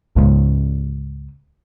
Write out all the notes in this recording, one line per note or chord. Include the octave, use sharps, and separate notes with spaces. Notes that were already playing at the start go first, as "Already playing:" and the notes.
C#2 G#2